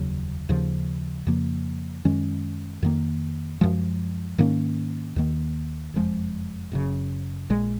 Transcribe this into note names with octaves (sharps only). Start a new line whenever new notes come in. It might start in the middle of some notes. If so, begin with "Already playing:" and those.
Already playing: F1 D#2 C#3 F#3
D#2 C#3 F3
F2 C#3 F3 A#3
F#2 D#3 G#3 C#4
F2 D#3 A#3
F#2 F3 G#3
G#2 D#3 A#3 C#4
D#2 D#3 A#3
F#1 F2 F3 G#3
F#1 F#2 C#3
A#1 A#2 G#3